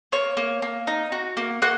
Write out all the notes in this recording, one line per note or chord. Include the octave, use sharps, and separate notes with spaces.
A#3 C#5
A#3
A#3
D#4
F#4
A#3
A#3 F#4 F#5